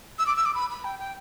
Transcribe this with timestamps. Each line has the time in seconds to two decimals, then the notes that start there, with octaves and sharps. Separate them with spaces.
0.19 E6
0.27 D6
0.36 E6
0.45 D6
0.55 B5
0.70 B5
0.84 G5
0.99 G5